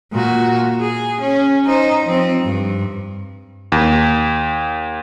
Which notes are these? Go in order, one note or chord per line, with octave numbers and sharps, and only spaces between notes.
A#2 F#4
G#4
C#4
D#4 C5
F3 C4
G2
D#2